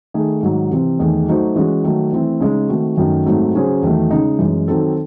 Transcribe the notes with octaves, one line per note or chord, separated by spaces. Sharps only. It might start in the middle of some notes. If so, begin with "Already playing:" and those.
D#3 A3 D#4 G#4
G#2 D#3 F#3
C3 E3 C4
E2 D#3 A3 D#4 G#4
F#3 A3 D#4 F#4 C5
E3 G#3 C#4 F#4
D#3 F#3 A3
E3 A3 C4 E4
C#3 G#3 D#4
D#3 A3 C4 F#4
F#2 D#3 F#3 A3
G#2 F#3 A3 C4 D#4
C#3 F#3 C#4 G#4 C5
E2 D#3 F#3 A3
C#3 G#3 D#4
F#2 E3 G#3
D#3 F#3 C4 D#4 A4